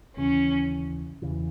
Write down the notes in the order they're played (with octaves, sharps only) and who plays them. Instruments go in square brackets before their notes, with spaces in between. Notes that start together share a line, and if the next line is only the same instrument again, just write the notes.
[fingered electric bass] D#2 C#3 E3 [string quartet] C#4
[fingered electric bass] E2 C#3 E3